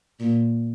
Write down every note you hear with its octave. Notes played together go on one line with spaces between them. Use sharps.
A#2